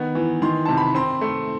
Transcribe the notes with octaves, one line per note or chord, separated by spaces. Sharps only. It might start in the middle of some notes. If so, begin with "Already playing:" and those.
Already playing: D#3 B3
E3
D#3 C6
C3 A5
B5
C4 C6
A3